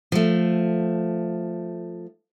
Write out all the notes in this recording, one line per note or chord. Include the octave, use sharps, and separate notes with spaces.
F3 A3